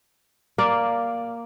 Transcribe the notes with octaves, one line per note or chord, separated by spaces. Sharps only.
A#3 D5 F5